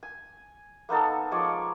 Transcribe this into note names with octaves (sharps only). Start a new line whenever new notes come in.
G#5
A#3 B3 D#4 A4
F3 G#3 C#5 D5